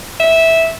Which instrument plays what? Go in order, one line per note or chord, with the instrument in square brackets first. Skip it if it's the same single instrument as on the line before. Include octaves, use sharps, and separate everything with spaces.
[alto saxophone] E5